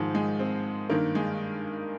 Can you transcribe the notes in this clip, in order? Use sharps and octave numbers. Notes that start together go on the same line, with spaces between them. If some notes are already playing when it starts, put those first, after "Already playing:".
Already playing: G#2 D#3 F3
G#3
C4
G2 D#3 A#3
G#3